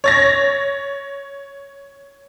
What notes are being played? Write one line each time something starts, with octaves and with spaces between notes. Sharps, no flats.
C#5 A6 A#6